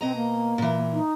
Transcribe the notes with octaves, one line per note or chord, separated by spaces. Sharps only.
B2 C4 D#5 A#5
A#3
A#2 E3
D#4